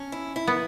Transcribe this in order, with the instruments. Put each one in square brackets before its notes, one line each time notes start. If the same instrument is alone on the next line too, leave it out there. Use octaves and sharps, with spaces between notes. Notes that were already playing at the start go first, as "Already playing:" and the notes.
Already playing: [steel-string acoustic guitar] C#4
E4
E4
[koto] B3